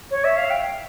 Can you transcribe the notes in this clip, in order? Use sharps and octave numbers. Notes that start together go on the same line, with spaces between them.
C#5
E5
F5
G5